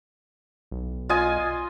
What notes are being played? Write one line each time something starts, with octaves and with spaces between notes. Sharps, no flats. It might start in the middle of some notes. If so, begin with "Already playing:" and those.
B1
F4 D#5 G#5